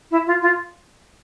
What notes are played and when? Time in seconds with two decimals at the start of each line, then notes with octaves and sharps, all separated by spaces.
0.11 E4
0.26 F4
0.42 F4